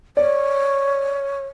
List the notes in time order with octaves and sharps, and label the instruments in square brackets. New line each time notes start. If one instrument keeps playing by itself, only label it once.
[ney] C#5 [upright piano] D5